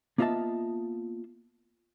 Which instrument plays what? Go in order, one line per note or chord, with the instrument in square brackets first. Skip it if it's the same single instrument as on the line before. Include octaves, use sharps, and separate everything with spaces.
[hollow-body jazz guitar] A#3 B3 F4 D#5 E5 A5